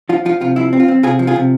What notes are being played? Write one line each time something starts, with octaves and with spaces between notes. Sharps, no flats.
F3 F4
F3 F4
C3 F4
F3 E4
C4
F4
C4
C3 F4 G#4
F3
F4 G#4
C3